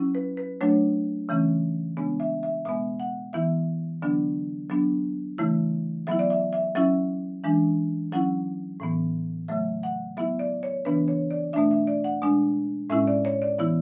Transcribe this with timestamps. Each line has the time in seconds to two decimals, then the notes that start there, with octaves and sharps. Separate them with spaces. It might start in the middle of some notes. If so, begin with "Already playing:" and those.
Already playing: F#3 C#4 E4
0.15 B4
0.37 B4
0.61 F#3 A3 D4 C#5
1.29 C#3 E3 A3 C#4
1.97 C#3 G#3 B3 D4
2.20 E5
2.43 E5
2.65 B2 G#3 B3 E5
3.00 F#5
3.33 E3 B3 E4 E5
4.02 D3 F#3 B3 D4
4.70 F#3 B3 D4
5.38 C#3 E3 A3 E4
6.07 F#3 B3 E4 E5
6.19 D5
6.30 E5
6.53 E5
6.75 F#3 C#4 E4 E5
7.44 E3 G#3 D4
8.12 F#3 C#4 E4 F#5
8.80 A2 E3 B3
9.48 C#3 F#3 A3 E5
9.83 F#5
10.17 F#3 B3 E4 E5
10.39 D5
10.63 C#5
10.85 C#3 E3 B3 D4 B4
11.08 C#5
11.31 D5
11.53 B2 A3 D4 E5
11.71 E5
11.87 D5
12.04 F#5
12.22 B2 G#3 D4
12.90 A2 G#3 C#4 E4 E5
13.07 D5
13.25 C#5
13.42 D5
13.59 E3 B3 E4